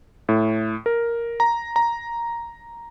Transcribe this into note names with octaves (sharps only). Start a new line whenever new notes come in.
A2
A#4
A#5
A#5